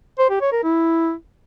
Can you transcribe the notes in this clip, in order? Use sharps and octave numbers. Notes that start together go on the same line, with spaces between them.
C5
G4
C#5
A#4
E4